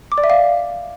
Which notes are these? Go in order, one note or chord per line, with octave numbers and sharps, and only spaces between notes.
D6
D5
E5
F5